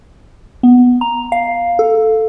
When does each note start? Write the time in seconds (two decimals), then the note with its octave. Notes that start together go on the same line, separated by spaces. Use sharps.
0.63 B3
1.01 A#5
1.32 F5
1.79 A4